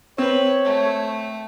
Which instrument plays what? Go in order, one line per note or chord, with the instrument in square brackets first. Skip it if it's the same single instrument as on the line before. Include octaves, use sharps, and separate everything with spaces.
[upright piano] C4 [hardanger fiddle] B4 [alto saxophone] C#5
[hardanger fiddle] A3